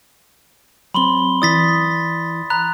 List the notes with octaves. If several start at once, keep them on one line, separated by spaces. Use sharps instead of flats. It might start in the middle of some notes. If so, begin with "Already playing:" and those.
F#3 C4 B5 C6 G7
E3 E4 D5 D#6 A6 B6
A#5 B5 F#6 F7